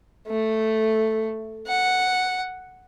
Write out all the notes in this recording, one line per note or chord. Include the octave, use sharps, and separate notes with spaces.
A3
F#5